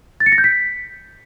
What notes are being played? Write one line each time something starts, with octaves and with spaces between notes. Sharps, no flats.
A6
C#7
A#6
G6
B6